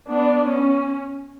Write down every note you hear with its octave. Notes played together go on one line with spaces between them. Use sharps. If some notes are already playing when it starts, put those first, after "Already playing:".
B3 D4
C#4